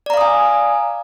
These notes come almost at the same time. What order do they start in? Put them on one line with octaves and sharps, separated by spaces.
D5 A#5 F5 D#6 G#5